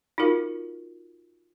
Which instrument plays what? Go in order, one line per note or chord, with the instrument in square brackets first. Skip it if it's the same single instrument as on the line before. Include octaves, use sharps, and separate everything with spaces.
[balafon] D#4 F4 F#4 A#4 F5